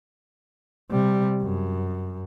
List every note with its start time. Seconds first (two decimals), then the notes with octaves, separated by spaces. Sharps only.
0.91 C3 G3
1.41 F#2